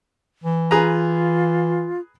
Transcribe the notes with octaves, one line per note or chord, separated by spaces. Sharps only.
E3
F4 G#4 B4 A#5